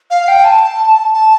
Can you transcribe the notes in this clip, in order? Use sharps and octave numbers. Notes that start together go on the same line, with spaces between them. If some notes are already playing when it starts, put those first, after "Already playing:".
F5
G5
A5
A5